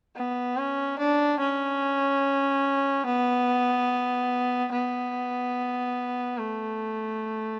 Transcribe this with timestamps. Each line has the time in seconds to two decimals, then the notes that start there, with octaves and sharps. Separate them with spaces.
0.16 B3
0.57 C#4
0.98 D4
1.40 C#4
3.05 B3
4.72 B3
6.38 A3